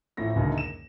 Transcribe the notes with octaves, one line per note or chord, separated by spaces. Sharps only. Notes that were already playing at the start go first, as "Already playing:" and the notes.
A1 A2 F3 A3 A#6
F#1 C#2 F#2 B2 D3 D#3
E7